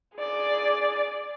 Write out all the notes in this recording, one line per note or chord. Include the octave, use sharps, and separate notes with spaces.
G#4 D5